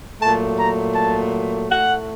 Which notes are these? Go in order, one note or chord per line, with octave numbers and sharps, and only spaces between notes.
A#2 F#3 A3 A5
A#5
A5
A2 A3 F#5